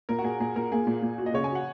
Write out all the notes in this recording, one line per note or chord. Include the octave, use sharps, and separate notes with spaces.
A#2 A#4
F#4
A#2 G#4
A#2 G#4
A#2 A#4
A#3 G#4
A#2
A#2
F#4
D#5
C#3 C#5
G#5
F#4 F#5